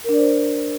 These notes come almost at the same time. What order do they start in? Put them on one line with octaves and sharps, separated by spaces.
A#4 D4 D5 C5